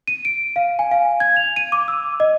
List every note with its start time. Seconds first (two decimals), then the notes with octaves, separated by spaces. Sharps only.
0.08 D#7
0.25 D7
0.56 F5
0.79 G#5
0.91 F5
1.20 G#6
1.36 F7
1.56 D#7
1.72 D6
1.88 E6
2.20 D#5